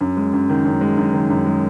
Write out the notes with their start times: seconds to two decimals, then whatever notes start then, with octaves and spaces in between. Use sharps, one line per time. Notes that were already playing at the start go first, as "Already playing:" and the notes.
0.01 F#2
0.17 G#3
0.33 F#2
0.49 D#3
0.65 F#2
0.81 G#3
0.97 F#2
1.14 D#3
1.30 F#2
1.46 G#3